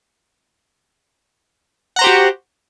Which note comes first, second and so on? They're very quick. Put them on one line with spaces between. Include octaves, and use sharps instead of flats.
F#5 A#5 C5 G4 F#4